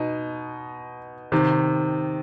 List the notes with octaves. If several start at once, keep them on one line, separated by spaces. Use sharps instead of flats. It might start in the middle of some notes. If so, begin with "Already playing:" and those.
Already playing: B2 D#4
C3 D#3